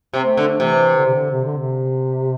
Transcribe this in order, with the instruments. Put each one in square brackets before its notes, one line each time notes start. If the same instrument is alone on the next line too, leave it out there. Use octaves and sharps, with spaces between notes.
[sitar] C3 [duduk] C4
[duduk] A3
[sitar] D3
[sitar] C3 [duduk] E3
[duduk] D3
C3
D3
C3
D3
C3